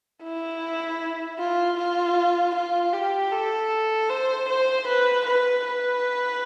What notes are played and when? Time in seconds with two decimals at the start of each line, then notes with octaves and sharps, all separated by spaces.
0.23 E4
1.38 F4
1.78 F4
2.55 F4
2.93 G4
3.32 A4
4.10 C5
4.49 C5
4.87 B4
5.27 B4
5.65 B4